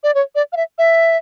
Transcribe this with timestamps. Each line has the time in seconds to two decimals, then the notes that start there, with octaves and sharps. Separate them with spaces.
0.03 D5
0.15 C#5
0.35 D5
0.53 F5
0.57 E5
0.78 E5